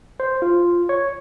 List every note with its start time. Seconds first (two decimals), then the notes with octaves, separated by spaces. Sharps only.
0.20 C5
0.42 F4
0.89 C#5